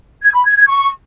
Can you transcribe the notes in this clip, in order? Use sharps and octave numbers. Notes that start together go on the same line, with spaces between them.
G#6
B5
G#6
G#6
C#6